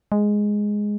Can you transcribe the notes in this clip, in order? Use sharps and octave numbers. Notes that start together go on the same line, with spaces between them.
G#3